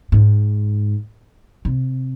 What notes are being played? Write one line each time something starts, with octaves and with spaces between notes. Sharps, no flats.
G#2
C3